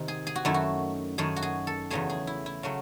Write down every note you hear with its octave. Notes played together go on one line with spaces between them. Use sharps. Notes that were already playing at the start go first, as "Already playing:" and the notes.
Already playing: C3 D#3
G#4
G#4
F#4
F#2 D#3 A3 E4
F#4
F#2 D#3 A3 G#4
F#4
G#4
A4
E2 C#3 F#3 A3 G#4
G#4
E4
E4
C#3 F#3 A3